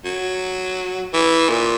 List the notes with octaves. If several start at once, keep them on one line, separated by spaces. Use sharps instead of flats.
F#3
E3
A#2